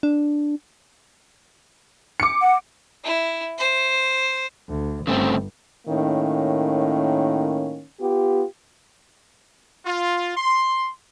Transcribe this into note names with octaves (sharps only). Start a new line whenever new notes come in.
D4
D6 C#7
F#5
E4
C5
D2
G1 C#3 A3 C4
A2 D#3 A#3 C#4
B3 F4 G4
F4
C6